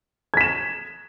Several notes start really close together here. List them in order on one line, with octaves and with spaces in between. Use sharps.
G#6 B6 E7